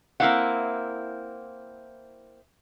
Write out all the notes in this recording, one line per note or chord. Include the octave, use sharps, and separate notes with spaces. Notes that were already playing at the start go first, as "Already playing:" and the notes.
A#3 C4 E4 C5 F5 F#5